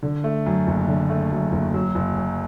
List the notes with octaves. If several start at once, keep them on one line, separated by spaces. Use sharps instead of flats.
D3
A3
F#2
F#1
D3
A3
F#2
F#1
F#3
F#1
F#2